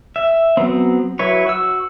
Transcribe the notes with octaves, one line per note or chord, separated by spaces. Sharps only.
E5
F#3 B3 C4
F#3 E4 B4 C#5
F#4 E6